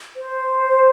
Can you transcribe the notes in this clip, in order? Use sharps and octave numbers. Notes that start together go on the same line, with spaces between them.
C5